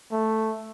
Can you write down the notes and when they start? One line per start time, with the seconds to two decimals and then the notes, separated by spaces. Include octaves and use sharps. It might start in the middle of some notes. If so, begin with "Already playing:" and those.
0.12 A3